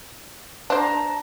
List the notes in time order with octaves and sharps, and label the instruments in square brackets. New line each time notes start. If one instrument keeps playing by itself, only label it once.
[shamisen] D4 C5 [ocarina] A5 [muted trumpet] A#5